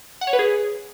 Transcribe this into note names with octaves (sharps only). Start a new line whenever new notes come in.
F#5
C#5
B4
G#4